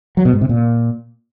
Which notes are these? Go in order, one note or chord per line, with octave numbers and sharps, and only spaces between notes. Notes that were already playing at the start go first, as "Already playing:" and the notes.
F#3
B2
G#2
C3
A#2